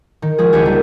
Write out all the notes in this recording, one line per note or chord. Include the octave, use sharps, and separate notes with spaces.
D#3
F3 G#3 G#4
C#2 D4 E4 F#4 G4 G#5
G3 A#3 D4